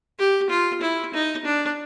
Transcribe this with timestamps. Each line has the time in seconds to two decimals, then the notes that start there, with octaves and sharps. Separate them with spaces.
0.19 G4
0.50 F4
0.82 E4
1.14 D#4
1.45 D4